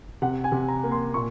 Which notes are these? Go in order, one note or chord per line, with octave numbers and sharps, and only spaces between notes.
C3 F#5
G#5
C3
A#5
A#3
C6
A#2 C#6